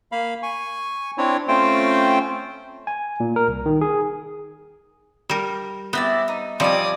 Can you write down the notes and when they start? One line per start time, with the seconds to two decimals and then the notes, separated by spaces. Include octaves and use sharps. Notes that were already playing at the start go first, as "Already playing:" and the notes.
0.12 A#3 F5 B5
0.43 G#5 C#6
1.18 C4 D4 E4 C#5
1.48 A3 C4 C#4 F4 C5 G5
2.87 G#5
3.20 A#2
3.36 A#4
3.48 C2
3.66 D#3
3.81 G#4
5.29 G3 A#4
5.93 B3 C4 E4 D5
6.28 D#4
6.60 F3 G3 C4 D5 D#5 G#5 D#6